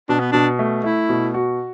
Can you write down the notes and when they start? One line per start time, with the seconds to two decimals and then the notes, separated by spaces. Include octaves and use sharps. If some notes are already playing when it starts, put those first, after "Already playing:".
0.09 B2 D4
0.20 B3
0.32 B2 D4
0.59 A3
0.84 A3 E4
1.09 B2
1.34 F#4